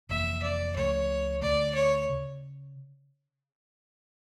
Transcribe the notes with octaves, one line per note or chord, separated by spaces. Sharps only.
F1 F2 E3 A#3 E5
D5
C#2 C#3 F3 A3 C#5
D2 D3 A3 D5
C#5
C#3